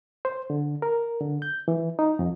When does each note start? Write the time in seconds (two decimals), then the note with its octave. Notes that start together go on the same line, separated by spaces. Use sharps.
0.25 C5
0.50 D3
0.82 A#4
1.20 D3
1.42 G6
1.68 E3
1.99 D#4
2.19 F2